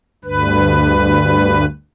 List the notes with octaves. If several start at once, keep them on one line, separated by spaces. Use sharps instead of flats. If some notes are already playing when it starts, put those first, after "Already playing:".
D2 G2 B4